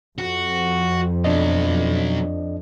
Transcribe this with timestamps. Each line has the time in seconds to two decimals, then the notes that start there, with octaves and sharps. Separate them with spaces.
0.18 F2 F#4
1.24 B2 F#3 D4 D5 D#5